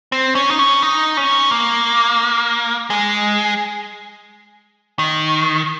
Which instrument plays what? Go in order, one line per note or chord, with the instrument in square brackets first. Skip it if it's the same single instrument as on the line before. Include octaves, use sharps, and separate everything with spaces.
[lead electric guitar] C4
C#4
D#4
C#4
D#4
C#4
A#3
G#3
D#3